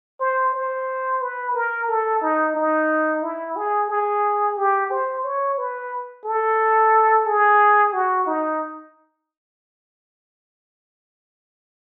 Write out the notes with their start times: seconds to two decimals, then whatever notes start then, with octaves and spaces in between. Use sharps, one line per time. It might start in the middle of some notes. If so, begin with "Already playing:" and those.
0.20 C5
0.54 C5
1.21 B4
1.55 A#4
1.89 A4
2.22 D#4
2.56 D#4
3.23 E4
3.56 G#4
3.90 G#4
4.57 G4
4.91 C5
5.25 C#5
5.58 B4
6.25 A4
7.26 G#4
7.93 F#4
8.27 D#4